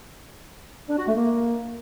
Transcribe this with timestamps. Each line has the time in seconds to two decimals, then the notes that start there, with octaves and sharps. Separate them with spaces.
0.89 D4
0.98 F#4
1.07 A3
1.15 A#3